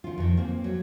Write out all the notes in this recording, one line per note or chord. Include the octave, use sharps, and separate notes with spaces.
D#3 F4
F2 D#3
A#3 C4
F#3